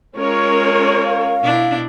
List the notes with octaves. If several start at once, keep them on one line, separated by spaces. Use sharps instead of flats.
G#3 C#4 F4 A#4 C#5
F5
B2 D4 E4